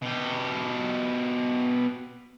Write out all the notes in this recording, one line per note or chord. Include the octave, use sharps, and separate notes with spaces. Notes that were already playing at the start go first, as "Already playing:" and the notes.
B2 G4